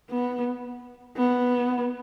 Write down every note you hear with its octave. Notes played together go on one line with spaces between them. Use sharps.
B3
B3